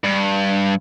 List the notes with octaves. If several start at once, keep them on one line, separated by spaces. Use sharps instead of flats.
G2